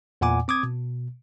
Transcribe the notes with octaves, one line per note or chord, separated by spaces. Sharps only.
E2 A#2 F#5 G#5 D6
C4 D6 D#6 G#6
B2